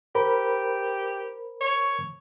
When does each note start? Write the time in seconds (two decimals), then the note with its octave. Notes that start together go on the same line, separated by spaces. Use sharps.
0.15 G4 A#4 C5 B5
1.61 C#5